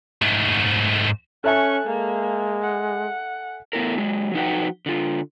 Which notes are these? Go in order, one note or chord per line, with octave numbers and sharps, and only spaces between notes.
G#2 A3
C#4 A4 E5 G#5 C#6 F#6
G#3 A#3
F#5
A3 B3 E4 A#4
F#3 G#3
F3 D#4 F#4 B4 F#5 G5
D3 F4